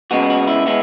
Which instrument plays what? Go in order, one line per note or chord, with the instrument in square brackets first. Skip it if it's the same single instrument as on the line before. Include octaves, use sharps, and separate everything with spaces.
[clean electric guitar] C#3 G#3 B3 F#4
F#4
E4
G#3 B3 E4